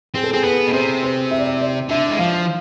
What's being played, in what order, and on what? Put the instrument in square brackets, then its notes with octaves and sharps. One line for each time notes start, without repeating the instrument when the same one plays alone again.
[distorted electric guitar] C4 [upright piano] G#4
[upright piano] A4
[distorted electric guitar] C4 [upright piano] G#4
[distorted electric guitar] B3 [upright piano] B4
[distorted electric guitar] B2
[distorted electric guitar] C3 [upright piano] C5
[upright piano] C5
E5
D5
E5
D5
[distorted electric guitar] D3 [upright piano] E5
[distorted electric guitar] G#3
[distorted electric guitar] F3 [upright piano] F5